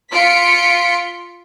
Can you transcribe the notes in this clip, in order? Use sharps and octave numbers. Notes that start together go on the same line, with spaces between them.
F4 B6 C#7 D7